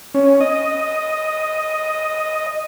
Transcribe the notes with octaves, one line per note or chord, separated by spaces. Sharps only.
C#4
D#5